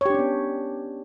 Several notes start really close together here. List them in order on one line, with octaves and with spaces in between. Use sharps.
C#5 G4 D4 C#4 B3